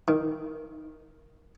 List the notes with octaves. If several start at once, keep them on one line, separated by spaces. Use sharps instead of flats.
D#3